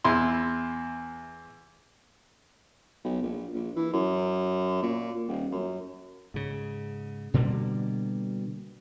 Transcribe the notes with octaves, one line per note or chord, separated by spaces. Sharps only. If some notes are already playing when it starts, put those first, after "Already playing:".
E2 E4 C6
B1
A#1
A#1
E3
F#2
A#2
D#1
F#2
G#2 C#3
B2 D3 G3 A#3